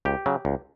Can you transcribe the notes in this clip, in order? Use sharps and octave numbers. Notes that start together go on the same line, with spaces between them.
C#2 G4
C#3 F#3
C#2